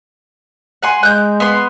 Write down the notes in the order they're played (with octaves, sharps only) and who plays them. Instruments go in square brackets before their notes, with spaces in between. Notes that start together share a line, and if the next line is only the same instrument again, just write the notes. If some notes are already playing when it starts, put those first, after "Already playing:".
[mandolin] F#5 G#5 C6
[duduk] G#3 [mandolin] F#6 G6
[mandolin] B3 C6